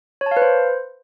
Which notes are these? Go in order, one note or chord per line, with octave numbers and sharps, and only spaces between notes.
C#5
A5
F5
B4
C5